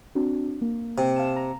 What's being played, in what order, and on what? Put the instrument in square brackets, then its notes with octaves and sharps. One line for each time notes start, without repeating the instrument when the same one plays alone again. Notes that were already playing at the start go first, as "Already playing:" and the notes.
[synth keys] C4 D4 F#4
A#3
[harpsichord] C3
[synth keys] F5 A5 E7
A#5